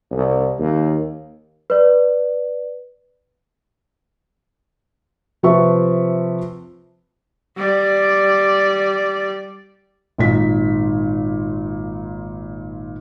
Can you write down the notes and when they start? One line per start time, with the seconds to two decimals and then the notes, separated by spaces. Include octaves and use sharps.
0.11 C2
0.59 D#2
1.70 B4 D5
5.43 C3 F3 B4 E5 A5 C#6
7.57 G3 D5
10.18 G#1 A#2 D#4 B6